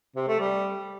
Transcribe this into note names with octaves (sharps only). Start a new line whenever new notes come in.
C3
A3
G3